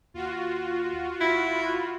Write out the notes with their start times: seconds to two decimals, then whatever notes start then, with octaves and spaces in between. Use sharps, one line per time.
0.14 D#2 F4 F#4
1.21 G1 E4 B5